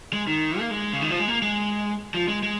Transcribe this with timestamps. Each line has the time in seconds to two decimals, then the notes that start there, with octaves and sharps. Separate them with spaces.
0.13 G#3
0.27 D#3
0.59 A#3
0.71 G#3
0.93 C#3
1.02 D#3
1.10 F3
1.20 G#3
1.28 A#3
1.42 G#3
2.14 F3
2.28 G#3
2.43 G#3